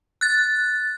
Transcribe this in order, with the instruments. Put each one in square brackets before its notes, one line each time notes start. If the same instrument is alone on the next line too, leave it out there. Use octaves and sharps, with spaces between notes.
[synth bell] F#6 A6